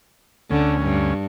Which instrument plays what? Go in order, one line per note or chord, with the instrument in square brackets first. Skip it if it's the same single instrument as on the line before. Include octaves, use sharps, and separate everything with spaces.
[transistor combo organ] D2 C#4 [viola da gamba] D3
[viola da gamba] G2